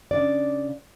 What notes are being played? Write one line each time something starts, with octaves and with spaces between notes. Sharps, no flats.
C#3 D4 D5